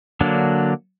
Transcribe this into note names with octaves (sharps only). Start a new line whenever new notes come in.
D3 F#3 A#3 D4